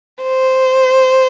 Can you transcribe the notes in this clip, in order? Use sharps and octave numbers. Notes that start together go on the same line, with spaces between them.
C5